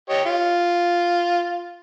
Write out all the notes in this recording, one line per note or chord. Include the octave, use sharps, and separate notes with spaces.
G4 C#5 D#5
F4